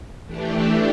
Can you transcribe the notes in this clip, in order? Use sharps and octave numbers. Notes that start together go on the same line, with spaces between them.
E3 A3 D4 G4